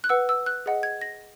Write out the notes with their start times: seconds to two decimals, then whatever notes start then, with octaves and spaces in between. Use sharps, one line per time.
0.04 F#6
0.09 B4 F#5 E6
0.29 E6
0.46 F#6
0.66 G#4 D#5 F#5
0.83 G#6
1.01 A#6